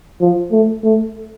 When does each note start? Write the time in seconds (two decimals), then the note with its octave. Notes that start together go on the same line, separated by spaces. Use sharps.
0.21 F3
0.52 A3
0.84 A3